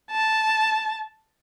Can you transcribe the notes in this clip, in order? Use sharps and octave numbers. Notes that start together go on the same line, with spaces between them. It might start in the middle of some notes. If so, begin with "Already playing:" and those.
A5